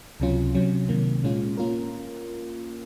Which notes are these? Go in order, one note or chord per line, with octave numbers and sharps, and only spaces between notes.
C#2 C3 F#3 C#4 F4
C3 F#3 C#4
C3 D#3 A#3
A#2 G#3 C#4 F4
A#3 C#4 F4 A#4